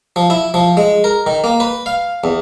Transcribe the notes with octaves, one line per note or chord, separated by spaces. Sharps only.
F3
E4
F3
G#3
A#4
D#3
A#3
B4
F5
E2